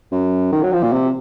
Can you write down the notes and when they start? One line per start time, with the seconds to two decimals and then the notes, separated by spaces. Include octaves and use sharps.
0.12 F#2
0.52 D#3
0.63 F#3
0.73 F3
0.83 A#2
0.93 C3